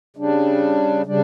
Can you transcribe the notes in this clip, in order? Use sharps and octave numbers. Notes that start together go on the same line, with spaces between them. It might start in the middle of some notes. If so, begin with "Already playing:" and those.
C#3 G3 D4
C#3 G3 D4